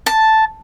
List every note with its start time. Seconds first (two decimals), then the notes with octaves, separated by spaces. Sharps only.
0.06 A5